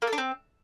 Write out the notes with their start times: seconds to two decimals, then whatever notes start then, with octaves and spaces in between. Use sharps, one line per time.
0.02 A#3
0.07 A4
0.13 D4
0.18 C4